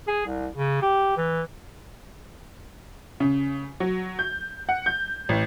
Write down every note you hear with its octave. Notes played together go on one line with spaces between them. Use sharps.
G#4
C2
C#3
G4
E3
C#3
F#3
G6
F#5
G6
A1